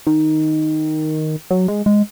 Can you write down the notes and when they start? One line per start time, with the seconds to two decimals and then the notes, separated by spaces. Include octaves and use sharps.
0.07 D#3
1.51 F#3
1.68 G#3
1.86 G#3